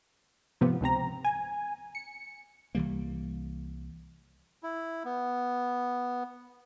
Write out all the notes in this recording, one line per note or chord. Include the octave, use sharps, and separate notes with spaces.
G#2 C3 F3 B3
C#2 C3 C4 A#5
G#5
C#7
C2 E3 G3 A#3
E4
B3